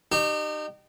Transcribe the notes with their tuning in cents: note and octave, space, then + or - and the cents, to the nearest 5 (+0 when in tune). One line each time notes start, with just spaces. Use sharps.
D#4 -35 G4 -20